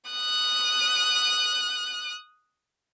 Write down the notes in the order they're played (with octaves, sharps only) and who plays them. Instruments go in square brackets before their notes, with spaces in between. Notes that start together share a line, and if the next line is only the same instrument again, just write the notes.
[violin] D#6 F#6